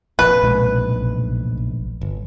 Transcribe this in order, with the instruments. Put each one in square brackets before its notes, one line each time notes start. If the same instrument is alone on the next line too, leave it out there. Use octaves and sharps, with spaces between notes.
[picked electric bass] F1 A#1 [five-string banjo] B4
[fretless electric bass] B1 A#2 G#3
[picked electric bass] G1